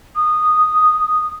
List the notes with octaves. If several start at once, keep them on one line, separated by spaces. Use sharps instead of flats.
D#6